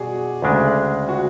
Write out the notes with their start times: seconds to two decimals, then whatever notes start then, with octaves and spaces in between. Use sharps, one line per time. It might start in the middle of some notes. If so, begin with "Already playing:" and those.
Already playing: B2 F#4 G#4 D5
0.42 D2 C#3 G#3 D4
1.09 F#4